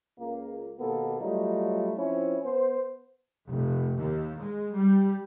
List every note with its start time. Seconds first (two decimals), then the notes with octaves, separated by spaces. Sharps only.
0.18 C#2 A#3
0.79 D#2 B2 A#3 B3 A4
1.21 F#3 G3 A3 D#4 F4
1.96 F3 C4 C#4 E4
2.44 B3 C5
3.47 F1
3.97 D#2
4.38 G#3
4.74 G3